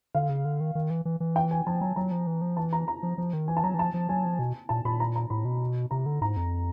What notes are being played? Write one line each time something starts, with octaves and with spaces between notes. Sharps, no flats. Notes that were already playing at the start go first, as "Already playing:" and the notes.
D3 F5
C#3
D3
D#3
D#3
E3
E3
E3
G5
G#5
F3 A5
F#3 A#5
F#3 A#5
F3
E3
F3
E3 A5
A#5
A#5
F3
F3
D#3
E3 G#5
A5
F#3 A#5
E3
F3 A5
F3
F#3 G#5
F3
B2
A#2 A5
A#2 B5
A#5
A#5
A2 B5
B2
C3 A#5
D3
G#2 A#5
F2